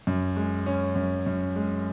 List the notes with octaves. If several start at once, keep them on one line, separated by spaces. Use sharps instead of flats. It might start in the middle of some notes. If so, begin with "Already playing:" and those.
F#2
G#3
C#4
F#2
F#2
G#3